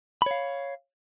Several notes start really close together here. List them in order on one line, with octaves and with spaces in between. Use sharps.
B5 C#5 F5